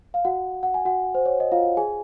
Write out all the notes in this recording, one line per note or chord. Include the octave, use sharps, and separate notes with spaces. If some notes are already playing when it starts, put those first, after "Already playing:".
F5
F#4 F#5
F#5
G#5
F#4 F#5
C5
C#5
D#5
F4 F5
G#4 G#5